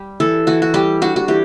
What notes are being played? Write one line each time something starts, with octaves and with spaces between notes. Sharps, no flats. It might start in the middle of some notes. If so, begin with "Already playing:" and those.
Already playing: G3 G4
E3 A4
E3 F#4
F#4
G3 G4
D4 F#4
F#4
E3 G4